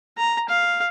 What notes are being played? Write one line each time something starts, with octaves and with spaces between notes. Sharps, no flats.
A#5
F5